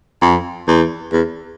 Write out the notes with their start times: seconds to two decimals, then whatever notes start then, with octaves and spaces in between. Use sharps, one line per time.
0.21 F2
0.68 E2
1.12 E2